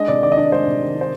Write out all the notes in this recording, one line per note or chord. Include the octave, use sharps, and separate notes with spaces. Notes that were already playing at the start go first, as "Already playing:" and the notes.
Already playing: G#3 D4 D#5
C3 D5
D#3 D5
D#5
D4 D5
G#3 C5
C3
D#3
D4
C5